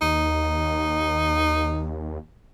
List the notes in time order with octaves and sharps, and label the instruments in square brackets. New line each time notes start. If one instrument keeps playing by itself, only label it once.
[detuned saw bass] D#2 [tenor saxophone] D#4